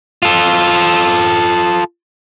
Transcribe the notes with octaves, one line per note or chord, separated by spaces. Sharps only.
F4 A4